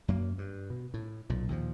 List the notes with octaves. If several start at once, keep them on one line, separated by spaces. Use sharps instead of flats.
F#2 F#3 A#3
G2
B2
A2
B1 A#2
D#2 A#2 F3